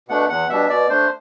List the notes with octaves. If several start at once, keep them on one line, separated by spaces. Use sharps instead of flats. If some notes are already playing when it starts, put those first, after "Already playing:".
B2 A3 D4 F#5
E2 F#5
B2 G3 D4 E5
B2 D5
A3 D4 C5